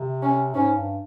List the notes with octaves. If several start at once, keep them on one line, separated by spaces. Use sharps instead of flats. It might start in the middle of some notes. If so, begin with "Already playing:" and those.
Already playing: C3
C#4
G#2 C#4
G2